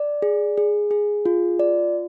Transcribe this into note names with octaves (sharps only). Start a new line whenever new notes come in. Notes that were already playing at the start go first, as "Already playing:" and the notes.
Already playing: D5
G#4
G#4
G#4
F4
D5